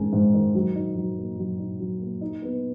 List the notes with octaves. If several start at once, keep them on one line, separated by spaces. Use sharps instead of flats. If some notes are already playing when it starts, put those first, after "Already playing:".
Already playing: G#2 D#3 G#3 C#4
G#2
D#3
F#3
D#4
F#3
A#3
F#3
D#4
F#3
A#3
D#4
B3